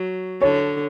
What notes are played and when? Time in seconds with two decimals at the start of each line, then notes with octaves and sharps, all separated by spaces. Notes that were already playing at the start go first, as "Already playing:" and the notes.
Already playing: F#3
0.42 D3 C#5